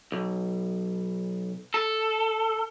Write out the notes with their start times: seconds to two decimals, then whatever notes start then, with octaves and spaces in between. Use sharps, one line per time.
0.12 B1
1.74 A4